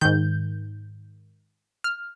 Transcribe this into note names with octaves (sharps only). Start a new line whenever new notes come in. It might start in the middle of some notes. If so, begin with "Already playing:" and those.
G#2 D#3 G6
F6